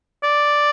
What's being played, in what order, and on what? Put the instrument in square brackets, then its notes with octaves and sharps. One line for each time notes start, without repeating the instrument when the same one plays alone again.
[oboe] D5